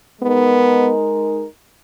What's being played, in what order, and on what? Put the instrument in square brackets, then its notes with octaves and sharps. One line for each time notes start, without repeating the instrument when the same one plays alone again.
[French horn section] G#3 D#4 A#4 [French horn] B3